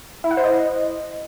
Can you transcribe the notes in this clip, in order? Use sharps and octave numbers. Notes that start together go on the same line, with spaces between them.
E4
F#5
C5
D#5